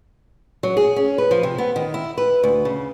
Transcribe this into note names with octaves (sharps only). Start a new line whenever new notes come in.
F#3
G#4
C#4
B4
F3
C3
B3
D#3
E4
B4
D2
C#3